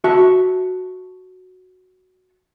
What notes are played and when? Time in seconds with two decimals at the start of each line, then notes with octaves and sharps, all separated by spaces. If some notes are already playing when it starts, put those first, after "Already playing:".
0.04 F#4 E5 A5